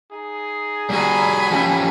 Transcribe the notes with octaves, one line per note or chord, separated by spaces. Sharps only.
D#4 G#4
G3 F#4 G#5 B5
F3 C#4 G4